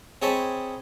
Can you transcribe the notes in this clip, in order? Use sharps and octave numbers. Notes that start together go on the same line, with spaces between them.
C4 G#4 C#5 D#5 A5 B5